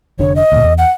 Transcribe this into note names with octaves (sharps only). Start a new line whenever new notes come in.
F1 D3 D4 C#5
D#5
D2 A#2
E2
F#5